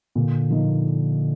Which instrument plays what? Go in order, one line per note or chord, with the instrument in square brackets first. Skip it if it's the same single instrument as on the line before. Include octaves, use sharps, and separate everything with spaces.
[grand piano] A#2 [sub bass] D3
[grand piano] F3 A#3 D#4